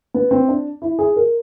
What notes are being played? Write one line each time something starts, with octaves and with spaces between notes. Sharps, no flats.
B3
C4
D4
E4
G#4
A#4